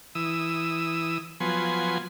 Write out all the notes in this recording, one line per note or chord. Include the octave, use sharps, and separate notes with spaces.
E3 D#6 E6
F3 F#3 B3 G#5 C6